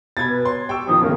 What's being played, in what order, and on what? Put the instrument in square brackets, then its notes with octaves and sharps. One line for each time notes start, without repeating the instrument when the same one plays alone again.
[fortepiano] B2 B5 [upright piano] G#6 A6
[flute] B4
[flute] C#5 [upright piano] C6
[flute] G4 [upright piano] G5 C#6 E6
[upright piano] F2 A#2 D#3 [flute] D#6
[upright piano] G1 [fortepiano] C#3 A3 [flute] A#4